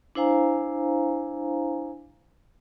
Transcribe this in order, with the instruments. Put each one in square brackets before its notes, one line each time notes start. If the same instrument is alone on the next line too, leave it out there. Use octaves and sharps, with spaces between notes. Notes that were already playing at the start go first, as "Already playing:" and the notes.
[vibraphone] D4 E4 C5 F5 G#5 A#5